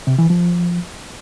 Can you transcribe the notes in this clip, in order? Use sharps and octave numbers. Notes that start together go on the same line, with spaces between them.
C3
E3
F3